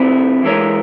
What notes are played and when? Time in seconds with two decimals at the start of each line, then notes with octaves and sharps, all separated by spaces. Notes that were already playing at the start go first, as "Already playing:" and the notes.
Already playing: F2 C3 F3 C4 E4
0.43 E3 G#3 E4 A#4 C#5